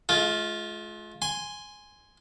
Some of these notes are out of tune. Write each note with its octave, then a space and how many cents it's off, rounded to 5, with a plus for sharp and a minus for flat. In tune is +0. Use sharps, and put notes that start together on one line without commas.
G#3 +45 F4 +0
G#5 +0 C6 +0